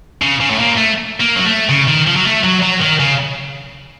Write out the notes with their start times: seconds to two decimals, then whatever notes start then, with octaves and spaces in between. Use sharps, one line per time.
0.22 C#3
0.40 C#3
0.50 A2
0.59 A#2
0.77 A3
1.20 A#3
1.36 F#3
1.46 A3
1.70 C#3
1.88 D#3
2.07 F3
2.16 F#3
2.25 A3
2.44 F#3
2.62 F#3
2.81 D#3
3.00 C#3